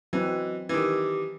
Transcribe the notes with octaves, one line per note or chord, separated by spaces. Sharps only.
E3 F#3 C4 F#4 D#5
D#3 E3 G4 D6